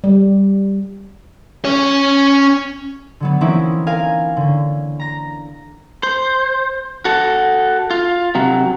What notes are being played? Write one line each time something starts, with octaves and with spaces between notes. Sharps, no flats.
G3
C#4 C#5
D3 F#3 B3
E3 A#3 C4 C#4 D#4 E4
A#4 F5 G#5
D3 C#4
A#5 A#6
C5
F#4 A4
F4
C3 F#3